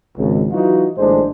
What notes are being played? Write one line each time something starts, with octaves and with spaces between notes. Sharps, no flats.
G#1 C#2
E3 F#3 D#4 F4 F#4
A#1 A2 D#3 G#3 D4 C5